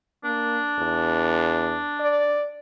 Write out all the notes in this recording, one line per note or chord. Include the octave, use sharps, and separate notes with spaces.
A#3 D4
E2
D5